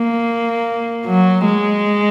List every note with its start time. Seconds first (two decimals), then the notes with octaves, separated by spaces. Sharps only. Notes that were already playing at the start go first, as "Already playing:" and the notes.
Already playing: A#3
1.06 F#3
1.45 G#3